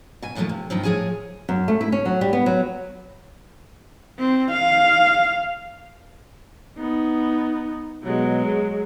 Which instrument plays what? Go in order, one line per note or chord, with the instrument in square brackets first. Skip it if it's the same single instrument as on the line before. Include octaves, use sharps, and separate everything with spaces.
[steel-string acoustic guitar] B2 G#5
E2 G#2 B2 F3 A3 A#3
C3
G2 D#3 F3 C4
A2 F3 G#4 C#5 G#5
[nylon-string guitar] F#2
A3
E4
C#4
F#3
G3
B3
F#3
[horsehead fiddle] C4
F5
[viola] B3 D#4
[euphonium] B2 [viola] F#3 G#3
[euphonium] G#4